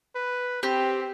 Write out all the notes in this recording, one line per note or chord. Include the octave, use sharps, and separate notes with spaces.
B4
C4 G4